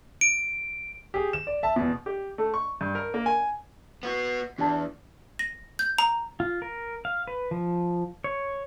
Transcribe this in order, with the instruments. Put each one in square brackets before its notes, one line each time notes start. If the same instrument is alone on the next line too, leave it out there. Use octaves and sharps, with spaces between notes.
[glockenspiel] D7
[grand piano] G4 G#4
E7
D5
E5 A5
E2 B2
[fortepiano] G4
A3
C#6
G2
A#4
A#3
G#5
[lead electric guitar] B3 F#4
[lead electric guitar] E2 [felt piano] D4 A5
[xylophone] A#6
G6
A#5
[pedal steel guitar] F4
A#4
F5
B4
F3
C#5